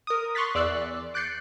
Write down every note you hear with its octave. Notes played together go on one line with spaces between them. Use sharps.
A#4 D#6
C6 C#6 F6 F#6 A6 B6
E2 D5 E6 F#6 C7
D6 F#6 G6 A6 C7 C#7